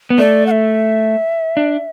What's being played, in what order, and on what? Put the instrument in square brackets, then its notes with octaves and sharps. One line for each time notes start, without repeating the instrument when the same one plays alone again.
[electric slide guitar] B3
[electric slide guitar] A3 [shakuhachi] D5
[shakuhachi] F#5
E5
[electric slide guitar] D4